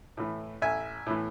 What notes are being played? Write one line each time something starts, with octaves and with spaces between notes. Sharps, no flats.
A2 E3
A1 E5 G#5
A2 E3